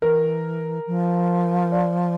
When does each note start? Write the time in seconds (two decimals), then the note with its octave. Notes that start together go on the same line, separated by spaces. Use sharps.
0.02 E3 A#4
0.87 F3
1.72 D5